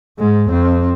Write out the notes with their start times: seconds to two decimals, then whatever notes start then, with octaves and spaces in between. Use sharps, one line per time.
0.19 G#2 G#3
0.50 F2 C4